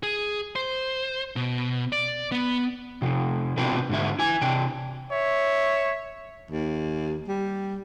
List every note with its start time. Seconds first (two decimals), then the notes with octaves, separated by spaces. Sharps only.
0.03 G#4
0.56 C5
1.36 B2
1.92 D5
2.32 B3
3.02 C3 F3
3.57 B2 C4 D4 F4 G4 B4
3.89 G#2 D3 E5
4.19 E4 G#5
4.41 C3 D4 G5
5.12 C#5 E5
6.51 D#2
7.28 G3